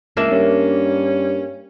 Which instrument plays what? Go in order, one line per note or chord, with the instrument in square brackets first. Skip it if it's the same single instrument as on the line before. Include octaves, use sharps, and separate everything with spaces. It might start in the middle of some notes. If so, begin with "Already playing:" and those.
[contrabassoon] C#2 [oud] A#3 D4 E5
[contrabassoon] G2 [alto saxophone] C#4